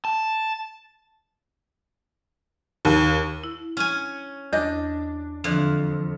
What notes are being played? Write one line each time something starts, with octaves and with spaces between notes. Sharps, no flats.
A5
D#2
E4
C#4 G#5
E2 D4 D#5 D6 D#6
F2 D3 E3 D4